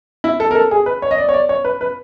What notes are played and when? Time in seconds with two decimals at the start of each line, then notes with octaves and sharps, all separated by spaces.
0.24 E4
0.40 A4
0.51 A#4
0.55 A4
0.71 G#4
0.86 B4
1.02 C#5
1.11 D#5
1.18 D5
1.29 C#5
1.34 D5
1.49 C#5
1.65 B4
1.81 B4